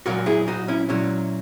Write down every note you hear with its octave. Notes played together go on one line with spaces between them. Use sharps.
A#2 F#3 F#4 A#4
E4 G#4
D#4 F#4
C#4 E4
A#2 F#3 C#4 E4